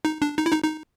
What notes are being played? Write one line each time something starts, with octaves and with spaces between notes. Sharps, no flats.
D#4
D4
D#4
E4
D#4
D#4